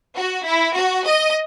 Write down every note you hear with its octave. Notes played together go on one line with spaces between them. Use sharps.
F#4
E4
F#4
D#5